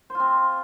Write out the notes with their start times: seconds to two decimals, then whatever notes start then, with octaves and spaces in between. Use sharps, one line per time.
0.10 C5
0.15 F4
0.20 C4